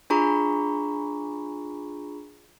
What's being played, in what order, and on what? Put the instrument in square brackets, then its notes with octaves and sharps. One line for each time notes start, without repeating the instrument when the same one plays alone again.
[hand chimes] D4 F4 G#4 A#5 B5 C#6